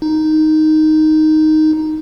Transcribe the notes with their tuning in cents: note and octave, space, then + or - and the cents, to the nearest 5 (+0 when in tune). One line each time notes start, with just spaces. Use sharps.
D#4 +0